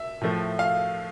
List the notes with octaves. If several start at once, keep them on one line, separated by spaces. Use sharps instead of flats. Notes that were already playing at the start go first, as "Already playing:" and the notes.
Already playing: E5
A2 F3 A3
F5